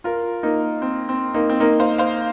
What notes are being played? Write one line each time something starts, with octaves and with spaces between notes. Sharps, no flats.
F4 A#4
A#3 D#4
C4
C4
A#3 D#4
C4
A#3 D#4
C5 F5
C5 F5